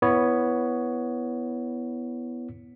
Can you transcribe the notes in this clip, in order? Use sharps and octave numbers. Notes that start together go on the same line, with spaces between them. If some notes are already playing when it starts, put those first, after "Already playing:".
B3 E4 C#5